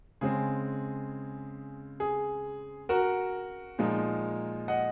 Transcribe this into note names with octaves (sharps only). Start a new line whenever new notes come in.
C#3 G#3 C4 G#4
G#4
F#4 A#4
A#2 F3 G#3 D#4
D#5 F#5